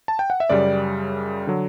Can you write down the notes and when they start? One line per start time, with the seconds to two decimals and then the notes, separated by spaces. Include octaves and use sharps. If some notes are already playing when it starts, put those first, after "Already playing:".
0.08 A5
0.19 G5
0.30 F#5
0.40 E5
0.50 F#2 C#3 G3 D5
1.47 D3 F#3